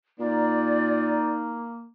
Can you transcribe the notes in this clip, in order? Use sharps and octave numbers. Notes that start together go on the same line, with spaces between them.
A#2 A#3 D#4 D5